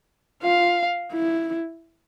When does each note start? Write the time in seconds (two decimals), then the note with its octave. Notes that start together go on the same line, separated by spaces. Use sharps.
0.43 F4 F5
1.13 E4